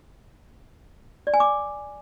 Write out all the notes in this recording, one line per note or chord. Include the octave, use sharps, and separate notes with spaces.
D5
G#5
D6